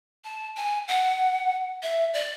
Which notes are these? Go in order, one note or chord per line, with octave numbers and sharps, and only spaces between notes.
A5
G#5
F#5
E5
D5